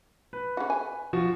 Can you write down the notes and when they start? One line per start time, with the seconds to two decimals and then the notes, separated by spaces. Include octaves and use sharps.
0.33 B4
0.57 C#3 F#4
0.70 G#5
1.13 F3 F4 F#4